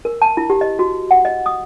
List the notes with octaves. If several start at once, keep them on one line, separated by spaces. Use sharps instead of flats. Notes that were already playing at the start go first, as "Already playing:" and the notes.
A#4
A5
E4
G4
D#5
F#4
F#5
D#5
D#6